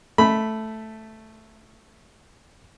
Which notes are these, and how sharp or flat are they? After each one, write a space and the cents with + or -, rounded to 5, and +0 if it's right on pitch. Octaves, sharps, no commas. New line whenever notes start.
A3 +0 B5 +0